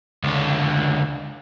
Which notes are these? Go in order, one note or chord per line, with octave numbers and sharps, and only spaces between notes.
C#2 D3